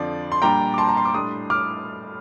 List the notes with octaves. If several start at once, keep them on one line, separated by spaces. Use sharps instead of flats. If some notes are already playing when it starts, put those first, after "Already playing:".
Already playing: F2 D3 F3 D5
C6
A#2 G3 D4 G5 A#5
D6
A5 C6
A#5
C6
D6
A2 G3 D4 C6 D#6
D6 F6